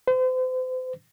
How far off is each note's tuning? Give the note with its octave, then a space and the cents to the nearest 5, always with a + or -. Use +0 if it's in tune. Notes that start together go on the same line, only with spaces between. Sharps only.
C5 -35